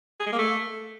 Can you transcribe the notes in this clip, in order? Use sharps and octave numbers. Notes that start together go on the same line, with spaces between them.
G#4
G#3
A#3
A3